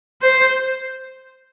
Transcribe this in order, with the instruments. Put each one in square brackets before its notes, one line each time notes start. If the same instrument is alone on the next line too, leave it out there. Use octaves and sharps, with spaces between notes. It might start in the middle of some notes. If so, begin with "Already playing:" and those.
[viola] C5